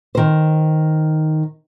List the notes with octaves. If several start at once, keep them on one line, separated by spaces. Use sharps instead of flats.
D#3 C5